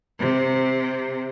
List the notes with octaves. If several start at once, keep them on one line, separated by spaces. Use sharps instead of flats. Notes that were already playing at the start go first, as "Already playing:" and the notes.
C3